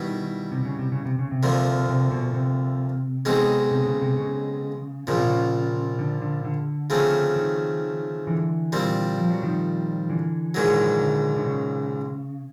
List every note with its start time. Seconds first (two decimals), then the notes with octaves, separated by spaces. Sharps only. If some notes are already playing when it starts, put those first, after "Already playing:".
Already playing: B2 D#3 G3 B3 E4
0.52 C3
0.65 C#3
0.79 C3
0.92 C#3
1.06 C3
1.19 C#3
1.31 C3
1.43 D2 D3 F3 A#3
1.89 C3
2.11 B2
2.34 C3
3.25 B1 B2 G#3 C4 D#4
3.71 C3
3.86 C#3
4.02 C3
4.17 C#3
5.07 A#1 A#2 C#3 F3
5.17 C3
5.26 C#3
5.99 D3
6.22 D3
6.45 D3
6.90 C#3 F3 A3 C4
7.36 D#3
8.27 D3 E3
8.72 A#2 G3 C4
9.18 F3
9.30 F#3
9.43 D#3 F3
10.10 D3 E3
10.54 A#1 G#2 D#3 F#3
11.01 D3
11.36 D3
11.46 C#3